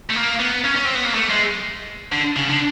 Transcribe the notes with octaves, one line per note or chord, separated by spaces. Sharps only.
A3
A#3
B3
C#4
C#4
C4
B3
A#3
A3
G#3
D3
C#3
D3